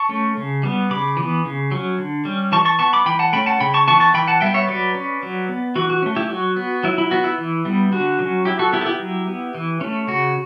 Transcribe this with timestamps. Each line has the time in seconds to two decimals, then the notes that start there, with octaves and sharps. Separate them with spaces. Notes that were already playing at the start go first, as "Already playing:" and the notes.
Already playing: A5 C#6
0.09 A3 C#4
0.37 C#3
0.63 G3 B3
0.90 C#3 B5 D6
1.17 E3 B3
1.45 C#3
1.71 F#3 C#4
1.99 D3
2.25 G3 C#4
2.52 E3 A5 C#6
2.65 A5 C#6
2.79 B3 A5 C#6
2.93 B5 D6
3.06 E3 G5 B5
3.19 F#5 A5
3.33 A3 C#4 G5 B5
3.46 F#5 A5
3.60 C#3 G5 B5
3.74 A5 C#6
3.87 E3 B3 A5 C#6
4.00 A5 C#6
4.14 E3 G5 B5
4.27 F#5 A5
4.41 G3 B3 E5 G5
4.54 C#5 E5
4.68 F#3 B4 D5
4.95 C#4
5.23 F#3
5.49 B3
5.75 E3 F#4
5.90 F#4
6.03 A3 C#4
6.16 E4 G4
6.30 F#3 F#4
6.56 B3
6.83 F#3 E4
6.98 E4
7.11 B3 F#4
7.24 E4
7.38 E3
7.65 G3 B3
7.92 D3 F#4
8.19 F#3 C#4
8.45 F#3 E4 G4
8.59 F#4 A4
8.73 B3 E4 G4
8.81 A4
8.86 E4 G4
8.99 F#3
9.27 B3
9.55 E3
9.81 A3 C#4
10.07 C#3 F#4